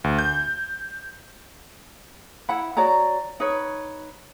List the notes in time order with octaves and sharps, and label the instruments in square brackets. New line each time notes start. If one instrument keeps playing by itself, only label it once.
[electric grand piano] D2
G6
[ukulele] E4 F#5 B5
F#4 C#5 D5 A#5
D#4 B4 C#5